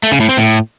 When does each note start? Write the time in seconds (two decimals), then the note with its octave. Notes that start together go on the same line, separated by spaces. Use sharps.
0.03 A3
0.12 C#3
0.20 A2
0.29 C4
0.37 A2